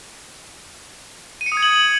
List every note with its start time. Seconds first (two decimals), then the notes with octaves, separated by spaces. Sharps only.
1.41 D#7
1.46 C#7
1.52 D#6
1.57 G#6
1.62 F#7